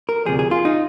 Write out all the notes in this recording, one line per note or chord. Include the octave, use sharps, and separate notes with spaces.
A#4
D2 C3 F3 G#4
G#4
F4
D#4